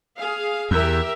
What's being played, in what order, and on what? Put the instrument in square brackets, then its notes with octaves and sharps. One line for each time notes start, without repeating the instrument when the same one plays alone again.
[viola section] G#4 F5
[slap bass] E2 [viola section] G4 A#4 E5